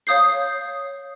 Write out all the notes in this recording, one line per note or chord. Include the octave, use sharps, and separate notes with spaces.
C#5 F5 D#6 G6 C7